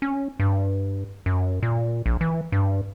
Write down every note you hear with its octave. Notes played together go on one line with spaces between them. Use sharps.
C#4
G2
F#2
A#2
A#1
E3
G2